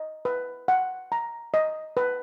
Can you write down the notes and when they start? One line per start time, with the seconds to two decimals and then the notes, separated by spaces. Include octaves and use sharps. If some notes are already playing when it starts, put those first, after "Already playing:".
Already playing: D#5
0.25 B4
0.68 F#5
1.12 A#5
1.54 D#5
1.97 B4